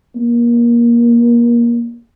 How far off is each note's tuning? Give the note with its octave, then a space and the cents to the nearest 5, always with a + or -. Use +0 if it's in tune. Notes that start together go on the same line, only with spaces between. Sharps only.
A#3 +25